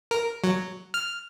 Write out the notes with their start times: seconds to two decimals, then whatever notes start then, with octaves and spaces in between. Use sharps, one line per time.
0.11 A#4
0.44 F#3
0.94 F6